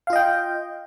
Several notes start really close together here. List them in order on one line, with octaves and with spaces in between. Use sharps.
F5 F4 D#5 G5